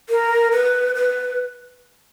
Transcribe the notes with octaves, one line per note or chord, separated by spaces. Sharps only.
A#4
B4
B4